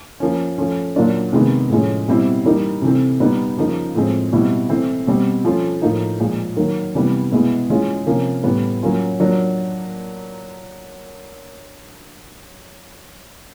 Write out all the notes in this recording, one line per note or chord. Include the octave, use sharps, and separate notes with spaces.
F3 A#3 C#4
F3 A3 C#4 F4
A#2 F#3 A#3 D4 F4
C3 D#3 G#3 B3
A2 F3 G#3 C#4
B2 G3 C4 E4
E3 G3 A#3 D#4
C3 E3 A3 C4
A#2 G3 B3 D#4
C#3 F3 A#3 D#4
A2 F3 G#3 C4
B2 G3 C4 E4
E3 A3 C4 E4
B2 G3 C4
F3 A3 C#4 F4
A2 F3 A#3 D#4
A#2 F3 G#3
D#3 F#3 A#3
C3 E3 G3 B3
B2 G#3 B3 E4
E3 G#3 C#4 F4
C3 F3 A#3 C#4
A2 E3 G3 B3
F#3 A#3 C#4 F4
F#3 A#3 D4 F4